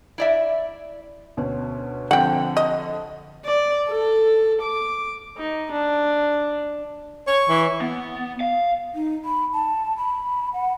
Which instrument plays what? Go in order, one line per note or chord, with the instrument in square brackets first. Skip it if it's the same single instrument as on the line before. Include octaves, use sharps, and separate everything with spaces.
[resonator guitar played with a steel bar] E4 D5 E5
[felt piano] D2 B2 C#4
[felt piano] D3 F3 C4 [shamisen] F#5 G5
[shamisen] D#5
[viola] D5
A4
D6
[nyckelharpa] D#4
D4
[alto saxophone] C#5 [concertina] C#6
[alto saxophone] E3
[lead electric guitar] B3
F5
[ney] D#4
B5
A5
B5
F#5